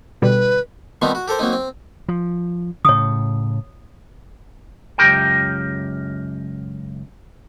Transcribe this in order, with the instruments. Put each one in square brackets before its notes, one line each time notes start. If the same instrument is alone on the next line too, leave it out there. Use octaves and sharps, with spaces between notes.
[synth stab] B2 D3 G3 [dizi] B4
[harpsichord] D#3 F3 G3 B3 C4 D#4
F#4
G4 A4 A#4 C5
F#3 A#3 C4 D#4
C4
[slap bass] F3
[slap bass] A2 C#3 [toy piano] C#5 D#6
[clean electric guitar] C#2 F#2 F3 G4 A#4 G5